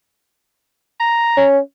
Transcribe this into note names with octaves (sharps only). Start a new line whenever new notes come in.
A#5
C#4